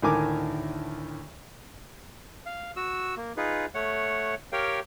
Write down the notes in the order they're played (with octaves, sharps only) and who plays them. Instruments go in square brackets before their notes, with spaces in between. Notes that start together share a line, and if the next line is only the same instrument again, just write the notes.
[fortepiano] D2 A2 D#3 A#4 G#5 D6
[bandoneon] F5
F#4 E6
A#3
D#4 F4 G#4 B4
A3 C#5 F#5
G4 A#4 C#5 F5 G5